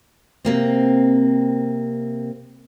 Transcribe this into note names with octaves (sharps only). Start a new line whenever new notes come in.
C3 A#3 C4